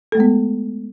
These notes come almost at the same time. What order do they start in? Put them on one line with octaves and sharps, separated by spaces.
A4 A3 G#3 B3